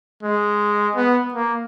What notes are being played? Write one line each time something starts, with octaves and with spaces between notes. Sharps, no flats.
G#3
B3
A#3